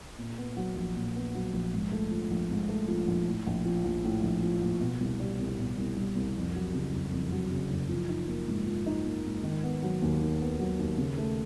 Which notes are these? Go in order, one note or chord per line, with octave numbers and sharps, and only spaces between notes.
A#2
B3
F#3
A#1
A#2
B3
F#3
A#1
G#2
A3
F3
A#1
G#2
A3
F3
A#1
A2
A#1
F3
A#1
A2
A#1
F3
A#1
B2
C2
G3
C2
B2
C2
G3
C2
F2
F#3
C#3
F#1
F2
F#3
C#3
F#1
F3
D#4
A#3
G#2
F3
D#4
A#3
G#2
D#3
B3
F#3
D#2
D#3
B3
F#3
D#2
C#3
A3